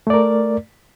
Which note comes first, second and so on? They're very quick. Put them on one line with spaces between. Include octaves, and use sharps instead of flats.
A3 D5 A#4